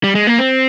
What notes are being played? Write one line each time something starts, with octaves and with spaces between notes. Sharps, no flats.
G3
G#3
A#3
C4